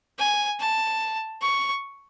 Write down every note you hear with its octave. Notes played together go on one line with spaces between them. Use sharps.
G#5
A5
C#6